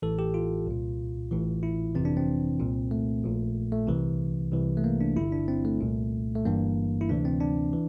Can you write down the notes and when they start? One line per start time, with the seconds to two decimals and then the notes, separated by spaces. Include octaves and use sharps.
0.02 A1 A2 E3 A4
0.19 G4
0.34 F4
0.67 C2 A#2
1.31 A1 A2 E3
1.63 E4
1.95 G1 F2 C3 E3 C4
2.05 D4
2.17 C4
2.59 C2 A#2
2.91 A3
3.24 A#1 A#2
3.72 A3
3.87 C2 C3 E3
4.52 C2 C3 E3
4.77 A3
4.84 A#3
5.01 D4
5.16 G1 G2 D3 E4
5.32 D4
5.48 C4
5.65 A3
5.81 C2 A#2
6.35 A3
6.45 G1 G2 E3 A#3
7.01 E4
7.09 D2 C3 E3 D4
7.25 C4
7.41 D4
7.73 E3